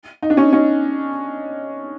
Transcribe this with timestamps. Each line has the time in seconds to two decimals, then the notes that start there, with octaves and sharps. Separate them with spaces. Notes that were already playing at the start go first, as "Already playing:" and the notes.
0.22 D#4
0.30 D4
0.37 C#4 D#4
0.53 C#4 D#4